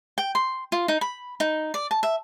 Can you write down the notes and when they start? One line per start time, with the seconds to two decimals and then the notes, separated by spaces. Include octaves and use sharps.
0.18 G5
0.35 C6
0.72 F4
0.88 D#4
1.01 B5
1.40 D#4
1.74 D5
1.91 A5
2.03 E5